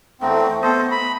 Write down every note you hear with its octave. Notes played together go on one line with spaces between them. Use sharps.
E2 A3 C4 D#4 F#4 G5
B3 A4 C5 D#5
B5